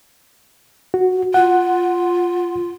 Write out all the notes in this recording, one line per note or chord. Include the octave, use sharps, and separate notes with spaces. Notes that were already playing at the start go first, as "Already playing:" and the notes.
F#4
F4 F#5